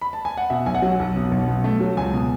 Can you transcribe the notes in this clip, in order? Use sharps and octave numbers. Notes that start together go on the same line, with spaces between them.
B5
A5
G#5
F#5
B2 E5
B1 G#5
F#5
F#3
B1
B2
B1
B2
A3
F#3
C#2 G#5
B2